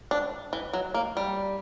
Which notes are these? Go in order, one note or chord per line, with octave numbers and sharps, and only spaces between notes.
D4
E3
F#3
A#3
G3